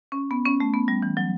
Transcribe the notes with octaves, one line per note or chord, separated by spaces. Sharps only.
C#4
B3
C#4
A3
B3
G3
E3
F#3